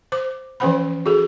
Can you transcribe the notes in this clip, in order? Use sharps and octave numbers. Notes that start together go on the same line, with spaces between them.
C5 D6
E3 F3 C#4 C5 F#5 B5
F#4 G#4 A4